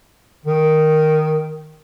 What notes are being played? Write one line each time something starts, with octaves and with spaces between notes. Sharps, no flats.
D#3